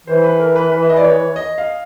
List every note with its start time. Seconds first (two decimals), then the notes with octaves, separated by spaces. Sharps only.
0.07 E3 C5
0.24 B4
0.40 A#4
0.56 B4
0.72 B4
0.82 E5
0.89 D#5
0.97 D5
1.04 C#5
1.36 D#5
1.58 F5